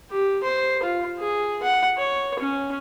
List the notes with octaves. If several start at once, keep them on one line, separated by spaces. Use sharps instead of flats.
G4
C5
F4
G#4
F#5
C#5
C#4